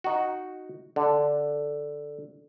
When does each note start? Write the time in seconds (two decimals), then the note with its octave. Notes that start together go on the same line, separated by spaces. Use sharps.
0.04 D#4 F#4
0.96 D3